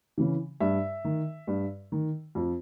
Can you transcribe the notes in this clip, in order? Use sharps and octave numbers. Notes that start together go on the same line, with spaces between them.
C#3 E3
G2 E5
D#3
G2
D#3
F2